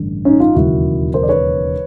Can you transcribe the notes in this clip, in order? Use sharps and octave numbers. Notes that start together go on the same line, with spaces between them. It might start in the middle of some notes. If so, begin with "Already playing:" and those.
Already playing: A1 G2 D3
C#4 D#4
D#4 F4
E1 D#2 C#3 F#3 E4 F#4
A#4 C5
D5
B4 C#5